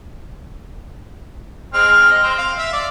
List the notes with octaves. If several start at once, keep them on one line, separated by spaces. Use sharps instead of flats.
G#3 C4 F6
D#5
C4 C5
F5
E5 F5
D5